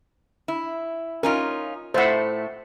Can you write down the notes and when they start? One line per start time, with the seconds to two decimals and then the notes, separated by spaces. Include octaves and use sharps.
0.48 E4
1.23 C#4 D#4 F4 A#4
1.94 A2 A3 C5 E5 F#5